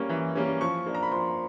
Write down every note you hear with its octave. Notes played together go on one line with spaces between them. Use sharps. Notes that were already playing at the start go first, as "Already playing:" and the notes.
Already playing: G3 A#3 C#4 C#6
E3
G3 A#3 C#4
F3 C#6
A#3 D4
A#5
B5
F3 C6